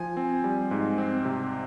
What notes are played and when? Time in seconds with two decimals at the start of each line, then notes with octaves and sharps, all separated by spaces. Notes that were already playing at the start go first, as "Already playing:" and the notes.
Already playing: F3 G#5
0.17 C4
0.44 G3
0.71 G#2
0.98 C4
1.25 C3